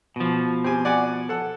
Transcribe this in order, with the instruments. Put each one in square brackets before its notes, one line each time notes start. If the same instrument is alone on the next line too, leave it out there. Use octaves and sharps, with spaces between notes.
[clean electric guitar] B2 F3
[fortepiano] C4 G4 G#5
D5 F#5 G#5
A4 F#5